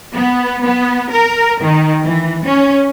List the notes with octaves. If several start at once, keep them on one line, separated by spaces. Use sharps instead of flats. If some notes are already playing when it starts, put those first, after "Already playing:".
B3
B3
A#4
D#3
E3
C#4